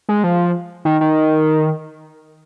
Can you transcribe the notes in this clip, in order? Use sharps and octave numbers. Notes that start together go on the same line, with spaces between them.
G#3
F3
D#3
D#3